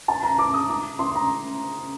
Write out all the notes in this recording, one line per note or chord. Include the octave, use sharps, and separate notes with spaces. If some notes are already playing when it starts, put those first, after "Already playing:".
A5
A#5
D6
D#6
D6
C6
A#5